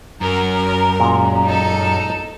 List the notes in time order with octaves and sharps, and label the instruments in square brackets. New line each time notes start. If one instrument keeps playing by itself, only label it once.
[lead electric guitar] F#2 [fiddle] A#4 [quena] A#5
[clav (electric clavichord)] A#2 G#3
[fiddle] D#4 A4